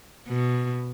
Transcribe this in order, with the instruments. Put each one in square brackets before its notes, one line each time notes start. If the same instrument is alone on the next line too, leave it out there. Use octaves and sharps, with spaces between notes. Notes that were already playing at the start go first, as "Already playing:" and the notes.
[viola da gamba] B2